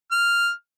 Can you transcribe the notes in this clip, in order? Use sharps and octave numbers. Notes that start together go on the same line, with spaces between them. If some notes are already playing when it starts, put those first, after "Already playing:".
F6